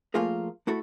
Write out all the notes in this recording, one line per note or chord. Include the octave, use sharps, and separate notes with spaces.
F3 A3 A#3 F4 G#4 A#4
A3 E4 F#4 A4